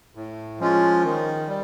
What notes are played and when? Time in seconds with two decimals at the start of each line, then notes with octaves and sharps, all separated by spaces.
0.15 A2
0.59 F3 G#3 C#4 F4
1.04 D#3
1.48 G3